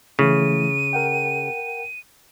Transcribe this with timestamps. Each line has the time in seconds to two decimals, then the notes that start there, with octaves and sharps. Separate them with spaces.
0.19 C#3 E3 A3 E4 D#7
0.93 A#4 F#5 G5